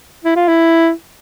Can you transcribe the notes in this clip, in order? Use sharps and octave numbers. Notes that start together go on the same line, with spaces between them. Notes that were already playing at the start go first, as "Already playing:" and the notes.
E4
F4
E4